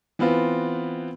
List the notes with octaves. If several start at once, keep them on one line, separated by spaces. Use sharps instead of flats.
E3 B3 C4 F4